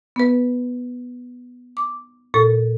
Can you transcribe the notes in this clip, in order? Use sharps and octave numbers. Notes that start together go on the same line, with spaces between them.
B3 B4
D6
A#2 A4